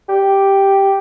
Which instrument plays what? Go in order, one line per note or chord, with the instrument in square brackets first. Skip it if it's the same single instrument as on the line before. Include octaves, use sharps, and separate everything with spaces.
[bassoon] G4